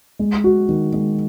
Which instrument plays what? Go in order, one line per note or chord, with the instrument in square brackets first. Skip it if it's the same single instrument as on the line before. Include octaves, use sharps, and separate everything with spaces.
[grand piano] G#3
F#4
D#3
G#3